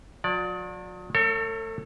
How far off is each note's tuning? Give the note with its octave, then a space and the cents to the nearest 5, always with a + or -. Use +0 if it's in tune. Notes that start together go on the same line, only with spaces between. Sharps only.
F#3 -45 D5 +0
A3 +0 A4 +40 C#5 -15